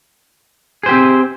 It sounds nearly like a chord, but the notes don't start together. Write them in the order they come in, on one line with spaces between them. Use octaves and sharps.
G#4 C5 G4 C4